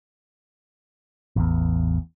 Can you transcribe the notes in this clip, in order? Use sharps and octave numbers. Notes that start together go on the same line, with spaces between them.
A1 E2